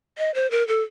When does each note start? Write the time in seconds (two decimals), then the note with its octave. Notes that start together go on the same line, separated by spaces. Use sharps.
0.18 D#5
0.35 C5
0.51 A#4
0.68 A4